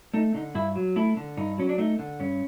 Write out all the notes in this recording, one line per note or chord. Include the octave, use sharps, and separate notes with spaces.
A3 D#4
D3 D#4
G2 E4
F#3
A3 E4
D3
G2 D#4
F#3 C#4
D4
A3 D#4
D3
G2 C#4